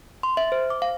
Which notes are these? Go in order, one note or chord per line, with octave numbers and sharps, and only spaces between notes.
C6
E5
C5
D6
F5